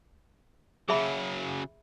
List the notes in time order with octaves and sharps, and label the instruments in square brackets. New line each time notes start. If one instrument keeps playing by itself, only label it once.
[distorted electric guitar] C#3 F#3 [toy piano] G#4 E5 B5